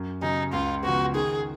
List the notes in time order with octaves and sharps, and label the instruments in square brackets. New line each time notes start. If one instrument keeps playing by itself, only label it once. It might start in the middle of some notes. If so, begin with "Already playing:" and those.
Already playing: [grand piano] F#2
[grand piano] C#3 F#3 C#4 [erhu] D#4
[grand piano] C#2 [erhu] F4
[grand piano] C#3 F3 B3 [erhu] F#4
[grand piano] D#3 [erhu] G#4